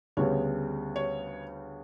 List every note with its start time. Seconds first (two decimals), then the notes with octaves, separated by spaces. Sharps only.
0.17 D2 C#3 G3 B3 C#5
0.96 C#5